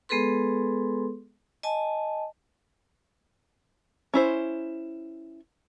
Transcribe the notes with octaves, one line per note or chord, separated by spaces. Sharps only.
G#3 B3 G#4 A4 B4 C6
D#5 G#5 A5
C#4 E4 C5